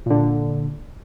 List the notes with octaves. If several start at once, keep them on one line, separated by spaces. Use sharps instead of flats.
A#2 D3